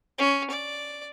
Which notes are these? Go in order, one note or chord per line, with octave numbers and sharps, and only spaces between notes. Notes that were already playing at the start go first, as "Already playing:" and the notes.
C#4
D5